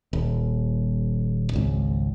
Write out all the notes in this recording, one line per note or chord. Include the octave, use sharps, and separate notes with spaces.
D#1
G#1 C#2